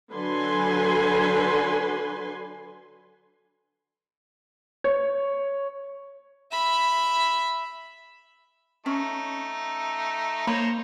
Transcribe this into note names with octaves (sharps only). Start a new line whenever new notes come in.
D3 F#3 B4 G#5 C6
C#5
E5 B5
A3 C#4 D#4
A#3 D#4 C5 C#5 B5